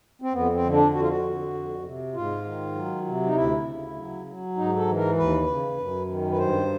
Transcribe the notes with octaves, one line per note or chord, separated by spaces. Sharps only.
C4
F2 B3
C4
D3
D4
F2 F#4
F4
F#4
D3
F2
C3
G#2 F4
D#3
F#3
C3
D#4
D2 E4
C#3
F#3
F#3
G#2 D#4
A4
E3
A#4
D#2 B4
C#3
F#2
D#3
B4
G2 C5